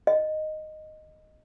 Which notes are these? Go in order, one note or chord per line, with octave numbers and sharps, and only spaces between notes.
D#5